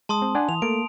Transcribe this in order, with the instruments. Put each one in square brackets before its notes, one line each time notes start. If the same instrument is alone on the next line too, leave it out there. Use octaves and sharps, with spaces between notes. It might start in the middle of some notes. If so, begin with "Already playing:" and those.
[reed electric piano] G#3 [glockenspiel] A5 C6 D#6
[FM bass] C4
[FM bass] D4 [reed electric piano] F#5 G#5 D#6
[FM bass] E3 [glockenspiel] F7
[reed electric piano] A3 A4 [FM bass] A#3 [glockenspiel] D7